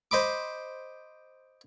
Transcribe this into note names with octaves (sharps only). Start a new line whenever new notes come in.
C5 D#5 B5 D6